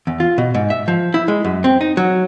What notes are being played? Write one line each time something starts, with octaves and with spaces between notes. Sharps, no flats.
E2
F4
B2
G#2
E5
F3
E4
G#3
F#2
C4
D#4
F#3